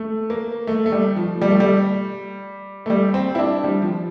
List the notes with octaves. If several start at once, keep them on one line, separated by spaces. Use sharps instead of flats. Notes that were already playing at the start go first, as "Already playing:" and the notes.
Already playing: A3
A#3
A3
A3
G3
F3
G3
A3
G3
A3
G3
C4
E4
D4
G3
F3